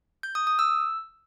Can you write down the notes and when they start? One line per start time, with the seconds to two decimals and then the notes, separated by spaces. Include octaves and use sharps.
0.23 G6
0.35 D#6
0.47 D#6
0.59 E6